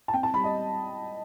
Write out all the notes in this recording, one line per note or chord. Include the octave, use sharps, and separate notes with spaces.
A5
C4 G5
A5
G3 B5
D#5